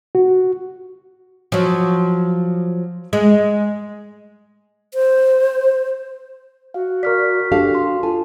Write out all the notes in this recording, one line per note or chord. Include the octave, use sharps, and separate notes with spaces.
F#4
F3 F#3
G#3
C5
F#4 F5
A#4 D5 C#6 F6 B6
D4 G4 A4 F5
C6
F4 A4 G#5 A5